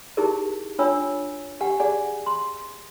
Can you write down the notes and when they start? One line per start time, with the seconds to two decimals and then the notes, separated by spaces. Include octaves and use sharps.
0.17 D#4 E4 G4 G#4 A#4
0.79 D4 F4 C#5 G5 G#5 E6
1.61 G4 F#5 G#5
1.80 G#4 D5 F#5 G#5
2.26 C6